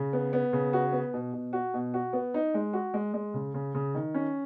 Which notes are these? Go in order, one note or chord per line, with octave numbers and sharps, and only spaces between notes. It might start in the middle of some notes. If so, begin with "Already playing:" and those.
Already playing: C#3
B3
B3
C#3
F#4
B3
B2
B2
F#4
B2
F#4
B3
D#4
G#3
F#4
G#3
G#3
C#3
C#3
C#3
D#3
C#4